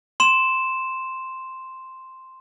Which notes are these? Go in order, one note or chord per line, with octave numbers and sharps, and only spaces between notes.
C6 E7